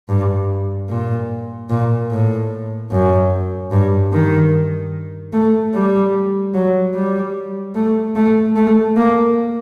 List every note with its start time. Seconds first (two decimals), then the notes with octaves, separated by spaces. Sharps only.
0.09 G2
0.89 A#2
1.70 A#2
2.10 A2
2.91 F#2
3.71 G2
4.12 D#3
5.33 A3
5.74 G3
6.54 F#3
6.94 G3
7.75 A3
8.15 A3
8.56 A3
8.96 A#3